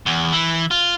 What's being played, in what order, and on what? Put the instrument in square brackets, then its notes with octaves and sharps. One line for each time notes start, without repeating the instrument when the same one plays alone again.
[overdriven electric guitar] E2
E3
F4